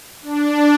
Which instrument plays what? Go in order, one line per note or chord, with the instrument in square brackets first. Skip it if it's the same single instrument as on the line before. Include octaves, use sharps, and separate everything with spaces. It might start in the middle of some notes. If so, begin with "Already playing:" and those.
[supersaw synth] D4